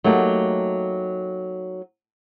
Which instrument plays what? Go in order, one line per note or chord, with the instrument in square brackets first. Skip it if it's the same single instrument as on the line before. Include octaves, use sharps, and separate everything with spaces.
[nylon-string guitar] F#3 A3 A#3 D#4 G4